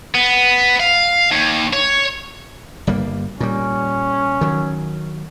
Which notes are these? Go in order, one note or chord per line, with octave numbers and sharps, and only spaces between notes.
B3
F5
D#2
C#5
G1 G3 A#3
A#2 G3 C#4
D#3 F#3